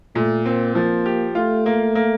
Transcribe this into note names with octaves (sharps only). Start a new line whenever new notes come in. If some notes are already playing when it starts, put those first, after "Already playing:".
A#2 A3
A#3 C4
F3 A#3
G4
A3 F4
A#3
A#3